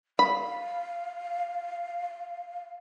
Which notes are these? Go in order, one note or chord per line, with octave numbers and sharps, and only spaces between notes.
F5 B5